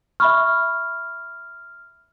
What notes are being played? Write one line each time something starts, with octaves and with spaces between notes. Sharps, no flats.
E5 B5 C#6 F6